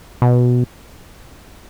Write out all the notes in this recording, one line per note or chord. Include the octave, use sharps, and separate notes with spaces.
B2